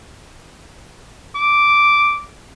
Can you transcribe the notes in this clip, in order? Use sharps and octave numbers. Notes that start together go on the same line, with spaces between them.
D6